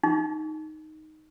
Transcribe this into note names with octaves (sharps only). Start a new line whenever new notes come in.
D#4